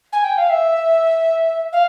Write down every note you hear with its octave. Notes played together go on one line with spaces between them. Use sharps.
G#5
G5
F5
E5
F5